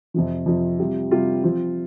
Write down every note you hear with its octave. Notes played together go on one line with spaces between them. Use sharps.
F2 C3 F3
F2 C3 F3
C3 G3 F4
C3 G3 F4
F3 C4 F4